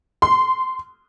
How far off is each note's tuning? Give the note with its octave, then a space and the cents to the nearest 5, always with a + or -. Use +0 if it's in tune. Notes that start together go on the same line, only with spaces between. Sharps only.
C6 -20